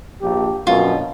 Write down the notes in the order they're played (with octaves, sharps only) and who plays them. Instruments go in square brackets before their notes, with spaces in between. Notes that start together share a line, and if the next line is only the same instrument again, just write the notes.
[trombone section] A#1 [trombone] G4
[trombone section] A#1 B2 [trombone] F#2 [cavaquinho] F4